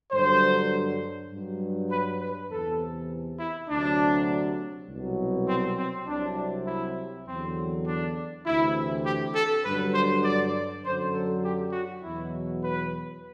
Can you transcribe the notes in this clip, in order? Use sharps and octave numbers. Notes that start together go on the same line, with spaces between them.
G2 D3 F#3 C5
G2 F#3
B4
B4
E2 C3 E3 A4
E4
D2 C3 F#3 D4
C2 B2 F#3
C4
C4
C2 C3 F#3 D4
E4
E2 D3 F#3 C4
D4
D2 C3 E3 E4
G4
A4
G2 D3 F#3 B4
C5
D5
F#2 D3 F#3 C5
A4
G4
F#4
E2 B2 F#3 E4
B4